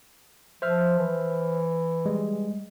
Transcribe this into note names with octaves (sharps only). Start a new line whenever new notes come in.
F3 C5 E5 F6
E3
G3 G#3